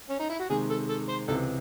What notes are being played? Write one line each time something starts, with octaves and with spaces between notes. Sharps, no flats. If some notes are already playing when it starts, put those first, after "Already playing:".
C#4
D#4
E4
F#4
C3 D#3 G#3 G#4
A4
A4
C5
C#2 C3 E3 A4